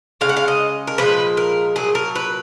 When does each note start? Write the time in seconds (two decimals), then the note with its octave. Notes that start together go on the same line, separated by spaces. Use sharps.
0.21 C#3 G#3 F5
0.29 F#5
0.37 F5
0.48 D#5
0.87 A#4
0.98 A#2 F3 G#3 B4
1.37 A#4
1.76 A#2 F#3 G#4
1.95 A#4
2.15 B4